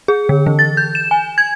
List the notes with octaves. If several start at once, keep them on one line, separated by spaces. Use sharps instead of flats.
G#4
D3
E3
A6
G6
E7
G#5
G#6